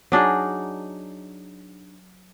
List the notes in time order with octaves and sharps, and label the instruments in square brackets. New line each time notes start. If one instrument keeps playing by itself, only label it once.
[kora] F#3 D4 D#4 G#4